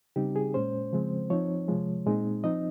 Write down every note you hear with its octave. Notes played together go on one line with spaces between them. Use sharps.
C#3 G3 C4 D#4 G4
G#4
A#2 G#3 C#4 C5
C#3 F3 G#3 C4
F3 C4 D#4 C#5
C3 F3 G#3
A#2 G#3 C4 D#4
F3 C4 D#4 D#5